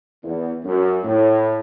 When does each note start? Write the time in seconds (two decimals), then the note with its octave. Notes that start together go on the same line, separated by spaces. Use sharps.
0.22 E2
0.64 F#2
1.04 A2